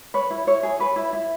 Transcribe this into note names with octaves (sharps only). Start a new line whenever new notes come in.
B4 C#5
E4
E4 C#5
G#4
B4 C#5
E4
E4